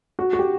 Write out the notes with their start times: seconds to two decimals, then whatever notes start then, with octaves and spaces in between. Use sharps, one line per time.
0.19 F#4
0.33 F#4
0.39 G4